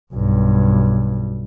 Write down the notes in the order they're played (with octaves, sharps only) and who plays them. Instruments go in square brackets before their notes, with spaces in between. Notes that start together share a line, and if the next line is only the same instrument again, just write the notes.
[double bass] B1 G2